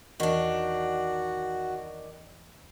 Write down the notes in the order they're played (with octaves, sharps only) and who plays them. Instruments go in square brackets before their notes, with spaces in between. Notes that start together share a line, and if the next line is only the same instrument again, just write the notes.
[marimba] E2 E3 C#6 [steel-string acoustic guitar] D#3 D4 [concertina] F#4